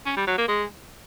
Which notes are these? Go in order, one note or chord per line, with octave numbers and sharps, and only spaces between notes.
C#4
G3
F#3
A#3
G#3